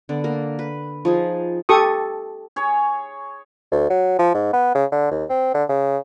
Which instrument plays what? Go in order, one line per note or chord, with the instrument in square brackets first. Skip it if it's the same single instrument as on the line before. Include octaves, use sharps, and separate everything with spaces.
[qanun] D3 B3 D5
A#3 A#4
B4
F3 D#4 G#4
[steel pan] G4 A4 C#6 D#6
[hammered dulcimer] G#4 C#5
[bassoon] D2
F#3
F3
G#2
B3
C#3
D3
D#2
C4
D3
C#3